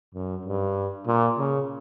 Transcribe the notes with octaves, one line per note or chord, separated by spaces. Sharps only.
F#2
G2
A#2
C#3